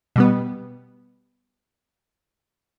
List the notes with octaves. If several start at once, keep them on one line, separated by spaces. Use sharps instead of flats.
B2 G3 B3